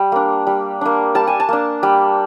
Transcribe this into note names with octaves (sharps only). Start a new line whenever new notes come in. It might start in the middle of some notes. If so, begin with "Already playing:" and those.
Already playing: G3
A#3 D4
G3
A#3 D4
G3 A5
G#5
A5
A#3 D4
G3